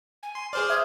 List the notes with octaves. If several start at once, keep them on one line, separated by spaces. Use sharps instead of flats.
G#5
C6
G#4 C5 D5 F6
E5 D#6 F6 G#6